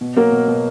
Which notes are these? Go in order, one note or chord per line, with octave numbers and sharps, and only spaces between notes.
B2
F#3 A#3 A#4
B2
B2